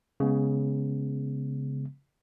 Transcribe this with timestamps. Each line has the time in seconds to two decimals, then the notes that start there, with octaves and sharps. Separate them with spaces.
0.20 C#3 G#3 B3